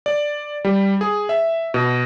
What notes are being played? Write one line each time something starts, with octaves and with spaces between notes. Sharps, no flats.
D5
G3
G#4
E5
B2